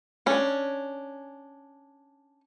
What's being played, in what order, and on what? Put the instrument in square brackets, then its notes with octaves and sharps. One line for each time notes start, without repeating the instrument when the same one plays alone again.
[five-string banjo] C#4 D4